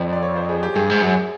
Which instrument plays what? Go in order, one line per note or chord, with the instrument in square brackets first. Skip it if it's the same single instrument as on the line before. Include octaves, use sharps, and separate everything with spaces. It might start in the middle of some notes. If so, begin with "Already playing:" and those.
Already playing: [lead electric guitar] F2 [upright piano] D5
[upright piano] D5
C#5
C5
G#4
G4
[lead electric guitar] G2 [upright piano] G#4
[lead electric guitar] G#2
F#2